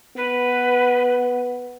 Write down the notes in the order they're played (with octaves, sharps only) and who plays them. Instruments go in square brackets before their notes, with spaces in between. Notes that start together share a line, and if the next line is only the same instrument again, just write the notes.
[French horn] B3 [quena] B4